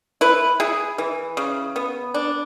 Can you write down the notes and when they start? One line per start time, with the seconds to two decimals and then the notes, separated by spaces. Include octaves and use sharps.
0.21 E4 B4
0.60 E4 G#4
0.98 E3
1.37 C#3
1.76 B3
2.14 D4